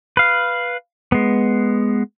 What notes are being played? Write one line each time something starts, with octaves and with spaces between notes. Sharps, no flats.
B4 F5
G#3 B3